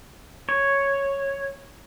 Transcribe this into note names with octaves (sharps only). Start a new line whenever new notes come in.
C#5